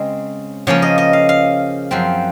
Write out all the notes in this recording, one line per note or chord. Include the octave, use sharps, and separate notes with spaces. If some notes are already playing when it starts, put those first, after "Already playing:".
Already playing: C#3 G#3 C4
C#3 F3 A#3 C#4 C#5
D#5
D#5
F5
F5
F#2 F3 C4